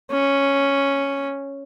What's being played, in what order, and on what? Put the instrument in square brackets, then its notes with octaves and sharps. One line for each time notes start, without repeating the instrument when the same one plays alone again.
[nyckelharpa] C#4